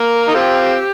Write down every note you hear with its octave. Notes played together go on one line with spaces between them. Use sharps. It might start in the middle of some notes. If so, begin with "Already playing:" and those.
Already playing: A#3 A#4
D#4
C4 F4 G4